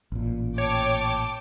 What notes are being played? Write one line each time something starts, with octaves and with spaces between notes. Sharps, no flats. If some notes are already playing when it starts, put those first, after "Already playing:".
A1 A#2
C#5 G5 A5 D6